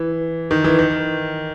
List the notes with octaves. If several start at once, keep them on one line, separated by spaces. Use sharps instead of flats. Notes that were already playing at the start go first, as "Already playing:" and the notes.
Already playing: E3
D#3
E3
D#3